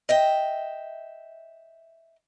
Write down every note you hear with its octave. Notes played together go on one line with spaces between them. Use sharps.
D#5 E5 G5